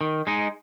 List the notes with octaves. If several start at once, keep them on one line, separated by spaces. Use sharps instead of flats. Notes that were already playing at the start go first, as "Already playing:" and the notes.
D#3
G#3 D#4